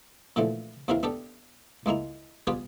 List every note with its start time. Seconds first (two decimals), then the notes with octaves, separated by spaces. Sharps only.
0.36 A#2 D3 E3 F3 A3
0.88 D#2 C3 E3 E4 A#4 F5
1.03 B3 D4 G4 A4
1.86 C#2 G#3 A#3 E4 A#5
2.47 G3 B3 F4 G4 G#4 B4